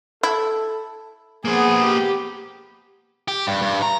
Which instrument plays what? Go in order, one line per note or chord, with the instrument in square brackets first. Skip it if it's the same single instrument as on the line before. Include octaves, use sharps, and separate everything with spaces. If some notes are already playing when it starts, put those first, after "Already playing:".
[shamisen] E4 [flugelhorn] A4
[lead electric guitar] A#3 C5 [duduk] B3 [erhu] G#4
[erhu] G4
[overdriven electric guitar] G4
G2
G2
A#5